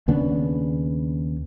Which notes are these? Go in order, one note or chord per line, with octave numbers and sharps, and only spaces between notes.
D#2 C#3 B3 D4